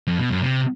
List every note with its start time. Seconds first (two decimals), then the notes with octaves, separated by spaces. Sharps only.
0.07 F2
0.19 B2
0.31 F#2
0.42 C3